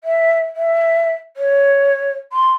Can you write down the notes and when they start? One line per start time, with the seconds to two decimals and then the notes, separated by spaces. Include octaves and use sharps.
0.04 E5
0.56 E5
1.36 C#5
2.32 C6